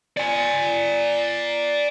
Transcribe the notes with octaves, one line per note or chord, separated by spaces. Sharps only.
D5 G#5